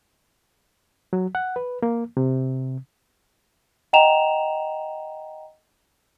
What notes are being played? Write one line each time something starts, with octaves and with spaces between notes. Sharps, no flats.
F#3
F#5
B4
A#3
C3
D#5 F#5 G5 A#5 E7 F7